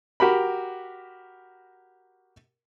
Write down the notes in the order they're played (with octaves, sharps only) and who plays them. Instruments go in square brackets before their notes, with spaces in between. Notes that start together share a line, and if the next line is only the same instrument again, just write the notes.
[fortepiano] F#4 G4 A#4 B5